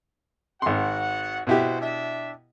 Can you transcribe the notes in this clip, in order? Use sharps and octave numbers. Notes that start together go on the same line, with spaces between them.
G#1 F#4 F#5 C6
B2 E4 F#4 G4 C5 F#5
D4 E5